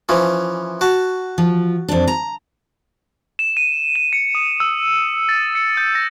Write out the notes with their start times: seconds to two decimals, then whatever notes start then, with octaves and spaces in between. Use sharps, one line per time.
0.09 E3 F3 C#4
0.81 F#4 A5
1.38 F3
1.88 F2 D4
2.07 A#5
3.39 E7
3.57 D#7
3.95 E7
4.13 C#7
4.35 D#6
4.60 E6
5.29 A6
5.55 C#7
5.77 G6
5.95 A#6